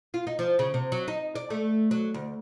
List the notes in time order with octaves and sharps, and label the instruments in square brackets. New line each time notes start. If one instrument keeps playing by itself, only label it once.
[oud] F4
D#4
F3
C#3
C3
F#3
D#4
D5
A3
F#3
D2